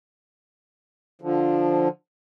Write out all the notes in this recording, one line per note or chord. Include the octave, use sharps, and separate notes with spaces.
D3 F3